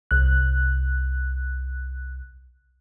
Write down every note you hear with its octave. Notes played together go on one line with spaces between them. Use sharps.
C2 F#6